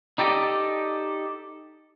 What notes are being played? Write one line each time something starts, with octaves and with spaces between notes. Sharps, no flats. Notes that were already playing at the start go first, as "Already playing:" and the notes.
D#4 G4 A4 D5 D#5